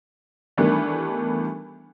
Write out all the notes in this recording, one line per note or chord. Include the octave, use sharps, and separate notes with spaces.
D#3 E3 G3 A3 B3 D4